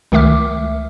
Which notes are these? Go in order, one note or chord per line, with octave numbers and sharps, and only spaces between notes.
C#2 D#3 A3 E5 D6 F6